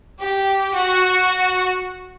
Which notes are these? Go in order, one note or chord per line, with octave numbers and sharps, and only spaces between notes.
G4
F#4